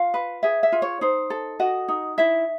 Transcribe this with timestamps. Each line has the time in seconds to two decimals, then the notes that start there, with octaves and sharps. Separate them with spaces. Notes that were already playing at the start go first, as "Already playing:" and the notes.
Already playing: F4 F5
0.14 B4
0.43 G#4 E5
0.63 E5
0.72 F4
0.82 C#5
1.01 D#4 C5
1.30 A4
1.60 F#4 D#5
1.88 D#4
2.18 E4 E5